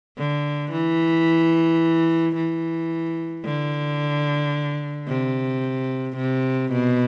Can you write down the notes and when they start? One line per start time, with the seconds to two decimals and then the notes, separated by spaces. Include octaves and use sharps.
0.18 D3
0.72 E3
2.36 E3
3.45 D3
5.08 C3
6.17 C3
6.72 B2